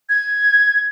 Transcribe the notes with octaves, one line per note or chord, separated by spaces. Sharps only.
G#6